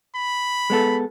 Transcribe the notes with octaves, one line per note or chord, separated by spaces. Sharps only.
B5
G#3 B3 A4